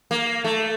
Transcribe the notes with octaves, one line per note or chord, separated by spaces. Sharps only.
A#3
A3